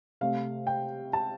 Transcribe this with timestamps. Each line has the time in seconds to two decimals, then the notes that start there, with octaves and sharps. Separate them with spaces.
0.21 C3 A3 F5
0.67 G5
1.13 A5